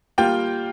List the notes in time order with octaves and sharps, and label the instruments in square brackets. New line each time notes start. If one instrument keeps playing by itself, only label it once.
[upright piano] G3 A#3 F4 G5